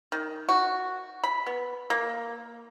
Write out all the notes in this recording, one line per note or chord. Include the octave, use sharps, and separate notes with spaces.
D#3
F#4
B5
B3
A#3